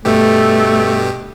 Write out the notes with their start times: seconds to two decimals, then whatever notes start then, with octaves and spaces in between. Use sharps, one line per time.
0.05 G2 B2 A3 G4